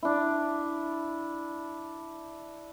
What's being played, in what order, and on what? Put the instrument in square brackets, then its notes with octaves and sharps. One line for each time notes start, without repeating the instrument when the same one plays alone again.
[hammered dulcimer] D4 E4